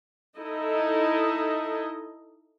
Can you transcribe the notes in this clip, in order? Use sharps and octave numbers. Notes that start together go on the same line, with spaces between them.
D#4 E4 A4 D#5